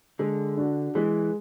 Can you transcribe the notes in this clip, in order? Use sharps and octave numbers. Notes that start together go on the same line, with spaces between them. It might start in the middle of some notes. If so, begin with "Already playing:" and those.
D3 G#3
D4 F#4
E3 G#3